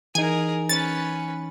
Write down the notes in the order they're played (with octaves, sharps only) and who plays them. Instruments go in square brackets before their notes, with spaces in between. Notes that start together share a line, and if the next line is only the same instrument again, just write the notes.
[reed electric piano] E3 D#4 [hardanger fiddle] G#4 A#4 [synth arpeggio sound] G#5
[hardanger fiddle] C#4 B4 [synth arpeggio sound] A6